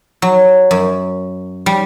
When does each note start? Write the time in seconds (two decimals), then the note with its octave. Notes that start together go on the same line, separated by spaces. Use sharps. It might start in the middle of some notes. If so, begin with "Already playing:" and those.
0.22 F#3
0.71 F#2
1.66 G3